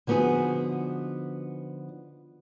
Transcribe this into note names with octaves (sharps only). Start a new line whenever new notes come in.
D3 F3 B3 D#4 F#4 G#4